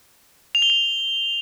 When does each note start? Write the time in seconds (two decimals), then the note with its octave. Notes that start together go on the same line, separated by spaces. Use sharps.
0.55 F7
0.62 G7
0.70 F7